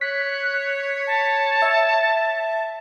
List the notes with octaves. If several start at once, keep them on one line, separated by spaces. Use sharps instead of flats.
C#5 F#6 B6
A5
E5